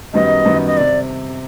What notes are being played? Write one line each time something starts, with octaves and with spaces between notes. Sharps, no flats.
F#2 D#3 G3 B3 D#4 D#5
F#2 D#3 G3 B3 D#4
D#5
C3 D5